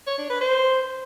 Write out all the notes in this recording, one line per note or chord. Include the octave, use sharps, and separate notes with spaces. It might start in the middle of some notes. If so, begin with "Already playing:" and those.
C#5
D4
B4
C5